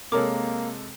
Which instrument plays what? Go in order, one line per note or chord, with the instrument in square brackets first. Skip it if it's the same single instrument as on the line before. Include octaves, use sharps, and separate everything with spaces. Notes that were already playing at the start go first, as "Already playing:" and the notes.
[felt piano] C3 G#3 A4 [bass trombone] A#3 [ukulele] A#4 [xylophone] C#5 A#5 D6